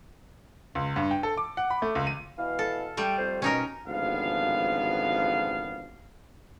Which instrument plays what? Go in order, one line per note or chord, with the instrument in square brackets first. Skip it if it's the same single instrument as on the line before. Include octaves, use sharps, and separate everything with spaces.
[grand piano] C#2
G2
G5
A4
D6
F#5
B5
A3
C#2
D#7
[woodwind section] B2 E3 F5
[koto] A4
[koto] G3 A3 [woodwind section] G5
[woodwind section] F2 C5
[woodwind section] B2 [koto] C#4 D#4 A#4
[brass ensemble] G#1 D2 C#3 F3 B3 F5